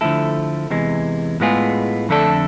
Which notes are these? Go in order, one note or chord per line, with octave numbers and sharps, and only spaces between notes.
D3 F3 A3 E4 A4
E2 C3 E3 G#3
A2 G#3 B3 F4 G#4
F2 D3 A3 D4 A4